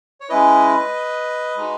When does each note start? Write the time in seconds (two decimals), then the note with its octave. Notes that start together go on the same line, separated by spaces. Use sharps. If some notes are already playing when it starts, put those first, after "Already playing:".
0.21 C#5
0.29 G#3 C#4 E4 B4 D#5
1.57 G#3 D#4 F#4